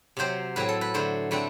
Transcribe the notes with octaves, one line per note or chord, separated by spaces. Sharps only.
C3 F#3 C4 C5
A2 F#3 C4 B4
A4
B4
D3 F#3 A3 C5
D3 A3 C4 B4